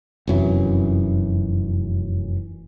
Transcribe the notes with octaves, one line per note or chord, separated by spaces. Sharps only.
F1 F#2 E3